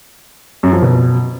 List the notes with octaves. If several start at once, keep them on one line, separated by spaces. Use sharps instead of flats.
F#2
F3
B2